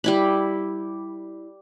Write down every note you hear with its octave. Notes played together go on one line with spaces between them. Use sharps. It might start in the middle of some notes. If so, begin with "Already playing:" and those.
G3 E4 B5